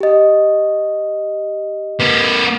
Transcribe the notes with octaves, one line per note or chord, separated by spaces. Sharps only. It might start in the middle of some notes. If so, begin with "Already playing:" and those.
G4 D#5
A#3 B4